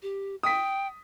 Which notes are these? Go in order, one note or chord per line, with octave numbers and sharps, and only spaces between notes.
G4
G5 D#6 B6